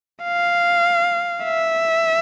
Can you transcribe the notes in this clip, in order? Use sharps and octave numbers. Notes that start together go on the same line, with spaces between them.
F5
E5